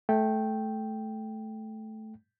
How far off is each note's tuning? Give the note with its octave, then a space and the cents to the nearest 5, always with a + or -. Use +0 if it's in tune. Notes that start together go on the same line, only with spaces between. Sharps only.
A3 -15 G5 +0